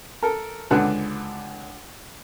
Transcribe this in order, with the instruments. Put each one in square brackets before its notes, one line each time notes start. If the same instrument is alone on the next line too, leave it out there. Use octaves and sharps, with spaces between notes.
[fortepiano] A4 A#4
C#2 D3 D4 B4 F#5